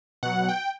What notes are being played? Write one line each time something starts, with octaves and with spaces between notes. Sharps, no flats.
B2 F#3 F#5
G5